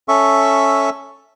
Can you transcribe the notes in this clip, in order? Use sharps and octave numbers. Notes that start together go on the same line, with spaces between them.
C#4 A4 E5 C#6